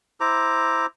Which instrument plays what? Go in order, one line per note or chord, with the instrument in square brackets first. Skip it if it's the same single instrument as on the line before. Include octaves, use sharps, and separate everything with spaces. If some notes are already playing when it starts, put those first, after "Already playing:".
[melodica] E4 C5 A#5 D6